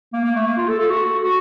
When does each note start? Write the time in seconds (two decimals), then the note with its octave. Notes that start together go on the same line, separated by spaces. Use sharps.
0.13 A#3
0.24 A#3
0.35 A3
0.46 A#3
0.57 F4
0.68 A4
0.79 A4
0.90 F#4
1.22 F#4